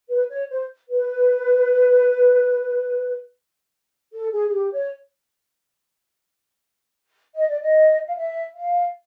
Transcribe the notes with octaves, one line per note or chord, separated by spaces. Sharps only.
B4
C#5
C5
B4
A4
G#4
G#4
G4
C#5
D#5
D5
D#5
F5
E5
F5